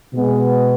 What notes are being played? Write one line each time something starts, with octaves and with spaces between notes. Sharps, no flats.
B2 G#3 B3